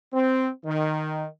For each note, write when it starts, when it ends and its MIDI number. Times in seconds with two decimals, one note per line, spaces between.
0.14 0.48 60
0.65 1.26 51